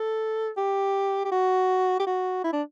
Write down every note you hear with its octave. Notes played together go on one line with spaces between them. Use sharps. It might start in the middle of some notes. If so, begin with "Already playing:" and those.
Already playing: A4
G4
G4
F#4
G4
F#4
E4
D4